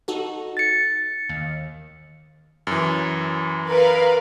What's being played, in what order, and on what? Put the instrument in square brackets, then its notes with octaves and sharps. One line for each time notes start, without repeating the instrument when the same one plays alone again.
[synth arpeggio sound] D#4 F#4 A4
[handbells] A6 C#7
[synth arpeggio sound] D#2
[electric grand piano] F#2 E3
[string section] A#4 B4 F5